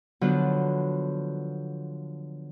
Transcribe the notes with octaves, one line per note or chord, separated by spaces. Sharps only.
D3 F3 F#3 B3 F4